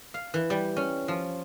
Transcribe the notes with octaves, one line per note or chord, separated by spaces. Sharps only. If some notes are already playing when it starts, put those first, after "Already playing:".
F5
E3
G3
C#4
F3